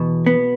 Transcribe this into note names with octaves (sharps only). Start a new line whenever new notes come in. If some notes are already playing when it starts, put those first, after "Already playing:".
Already playing: E2 B2
B3